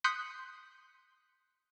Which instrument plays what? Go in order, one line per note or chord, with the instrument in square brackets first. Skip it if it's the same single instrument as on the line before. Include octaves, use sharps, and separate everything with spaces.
[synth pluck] C6 D#6 F#6 G6 B6 C#7